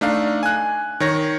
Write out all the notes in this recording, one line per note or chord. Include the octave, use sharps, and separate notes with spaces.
A3 D4 D#4 F5
G#5 F#6
D#3 C#5 A#6